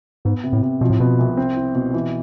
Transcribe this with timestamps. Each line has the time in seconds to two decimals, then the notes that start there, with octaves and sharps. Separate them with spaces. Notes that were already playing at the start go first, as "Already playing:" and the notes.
0.25 G#2 B3
0.44 C3
0.53 A2
0.62 C3
0.81 B2 F3
0.90 A2
1.00 B2 B3
1.19 C2
1.37 C4
1.56 E4
1.75 B2
1.94 E3